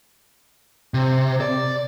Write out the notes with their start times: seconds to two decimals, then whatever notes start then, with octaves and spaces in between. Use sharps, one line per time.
0.94 C3
1.41 D5